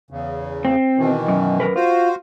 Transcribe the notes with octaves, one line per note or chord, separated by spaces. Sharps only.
E2 C#3
C4
B2 D#3 E3
F#2
F#2 A#4 B4
F4 F#4 C5